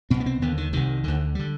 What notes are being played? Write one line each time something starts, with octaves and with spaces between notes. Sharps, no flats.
C2 B2 C4
B3
C4
D#2 D3 B3
D#3
C2 C3 D#3
D2 D3
D3 G3